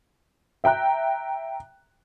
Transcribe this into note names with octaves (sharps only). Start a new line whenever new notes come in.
E5 G5 A#5 F#6